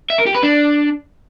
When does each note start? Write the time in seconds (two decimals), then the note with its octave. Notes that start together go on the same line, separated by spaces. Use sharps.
0.10 E5
0.18 A#4
0.27 G4
0.35 B4
0.43 D4